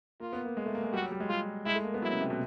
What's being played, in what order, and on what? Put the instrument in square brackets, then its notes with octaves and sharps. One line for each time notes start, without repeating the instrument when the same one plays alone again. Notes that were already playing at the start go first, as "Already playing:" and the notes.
[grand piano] A#3 [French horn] F4
[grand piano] B3
A#3
G#3
A3
A#3
G#3
[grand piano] G3 [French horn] F#4
[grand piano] F#3
G3
G#3
[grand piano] G3 [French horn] F4
[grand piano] G#3 [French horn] E4
[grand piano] A3
A#3
B3
[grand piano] F#3 [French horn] E4
[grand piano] C#3
C3
B2